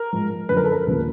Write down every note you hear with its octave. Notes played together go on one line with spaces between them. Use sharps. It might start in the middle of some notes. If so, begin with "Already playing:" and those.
Already playing: A#4
G#2 F3
F#2 D3 F3 B4
A#4
A4
A#4
D#2 C#3 F3